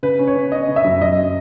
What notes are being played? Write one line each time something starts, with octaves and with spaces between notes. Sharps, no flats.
C#3 B4
C#4
C#5
C#4
C#4 D#5
C#3
E5
F#2
F#2 D#5